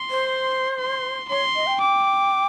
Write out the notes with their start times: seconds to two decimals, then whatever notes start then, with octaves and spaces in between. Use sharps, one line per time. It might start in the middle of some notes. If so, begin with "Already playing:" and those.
Already playing: C6
0.10 C5
0.79 C6
1.29 C#5 C6
1.55 D#5
1.68 G5
1.81 D6